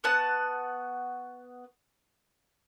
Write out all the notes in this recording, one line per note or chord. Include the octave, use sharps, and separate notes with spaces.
B3 F#4 F#5 A5